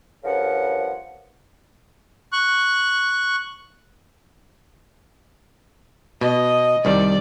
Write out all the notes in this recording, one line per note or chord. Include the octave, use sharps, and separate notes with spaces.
G2 C#3 F3 A#4 F#5
C#6 F#6
B2 D#5
C2 D#3 G3 D5